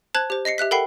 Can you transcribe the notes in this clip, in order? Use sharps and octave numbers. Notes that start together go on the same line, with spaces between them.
C5 A5 F#6 G#6 F#7
G4 C5
D#5 A#6 C7 C#7
G4 E5 F#6 B6
A4 A#4 F#5 G5 B5 C7